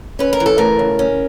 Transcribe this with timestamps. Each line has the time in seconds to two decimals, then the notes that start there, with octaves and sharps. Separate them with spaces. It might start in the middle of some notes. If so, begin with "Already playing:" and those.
0.19 C#4 B4
0.33 A#4
0.40 E3
0.46 A4
0.58 A3 A#4
0.79 C#3
0.99 C#4